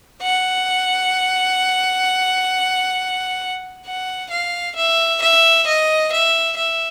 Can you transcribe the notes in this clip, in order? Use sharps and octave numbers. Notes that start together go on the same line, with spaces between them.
F#5
F#5
F5
E5
E5
D#5
E5
E5